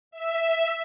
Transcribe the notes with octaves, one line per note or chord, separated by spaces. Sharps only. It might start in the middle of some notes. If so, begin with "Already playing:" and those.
E5